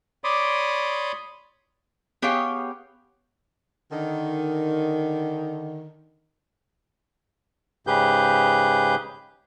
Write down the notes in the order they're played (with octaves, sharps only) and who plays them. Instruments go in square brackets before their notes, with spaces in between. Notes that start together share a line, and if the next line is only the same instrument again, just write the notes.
[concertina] C#5 D5 B5 C6 D6 D#6
[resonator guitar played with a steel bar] B3 G4 G#4 C#5 F5 G5
[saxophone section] D3 D#3
[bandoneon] G#2 C#3 G4 G#4 B4 G6